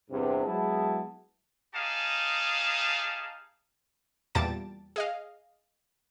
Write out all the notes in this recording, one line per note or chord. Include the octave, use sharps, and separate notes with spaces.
E2 G2 C3
F#3 G#3 B3 E4 G#4 A5
D#4 G4 G#4 F5 A5
E2 A#2 G3 A5 A6 D7
G#4 D#5 F5